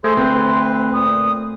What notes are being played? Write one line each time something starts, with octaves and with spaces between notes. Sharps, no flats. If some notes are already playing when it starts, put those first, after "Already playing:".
A3 G#4 A4 C5 C6
D2 C4 B4
A#2 D#6